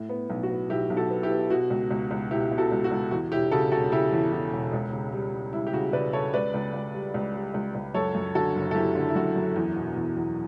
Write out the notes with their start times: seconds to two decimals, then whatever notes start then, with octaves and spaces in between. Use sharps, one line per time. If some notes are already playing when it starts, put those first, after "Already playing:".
Already playing: A2
0.09 B3
0.30 B1
0.43 F#4
0.50 B3
0.70 B1 E4 G4
0.90 B1
0.97 F#4 A4
1.10 B3
1.23 E4 G4
1.30 B3
1.50 B2 F#4
1.70 C#2
1.91 C#2
2.11 C#2
2.31 B2 E4 G4
2.51 B2
2.58 F#4 A4
2.71 C#2
2.84 F#4
2.91 C#2
3.11 E2 F#4
3.32 E1 E4 G4
3.51 C#3 F#4 A4
3.72 E1 F#4 A4
3.92 C#3 E4 G4
4.12 E2
4.32 E2
4.53 E1
4.73 C#2
4.93 C#3
5.12 G3
5.33 G3
5.53 G3 E4
5.67 G4
5.73 C#3 F#4
5.93 C#3 B4 D5
6.13 C#3 A4 C#5
6.34 C#2 B4 D5
6.54 C#2
6.73 C#2
6.94 G3
7.14 C#2
7.34 G3
7.54 C#2
7.75 C#2
7.94 F#2 A4 C#5
8.15 F#2
8.35 D3 F#4 A4
8.55 F#1
8.71 A4
8.75 F#3 E4 G4
8.95 D3
9.09 E4
9.15 F#2 F#4
9.36 F#2
9.56 E2
9.76 B2
9.96 E2
10.17 E2